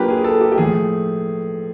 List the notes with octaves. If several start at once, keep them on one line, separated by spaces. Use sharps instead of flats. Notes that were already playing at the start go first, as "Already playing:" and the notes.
Already playing: F#3 A#3 D4 F4 G4 A#4 B4
G#4
A4
G4
G4
A2 F3 A3 G#4